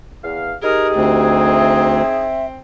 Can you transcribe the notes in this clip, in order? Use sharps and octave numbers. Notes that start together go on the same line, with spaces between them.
E2 F5
D#4 G4 G#4 A#4
D2 C4
E5